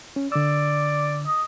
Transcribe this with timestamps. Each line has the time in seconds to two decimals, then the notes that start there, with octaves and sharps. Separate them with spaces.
0.16 C#4
0.32 D3 D5 E6
1.26 D#5